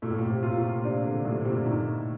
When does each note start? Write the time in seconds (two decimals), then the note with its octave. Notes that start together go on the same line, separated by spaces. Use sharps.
0.02 A#2 A3
0.10 A2
0.19 A#2
0.30 C3
0.43 F4
0.52 A2
0.57 A#2
0.84 C3 D4
1.04 D3
1.25 A2 C3
1.40 C3
1.45 A#2
1.66 A#2 D#3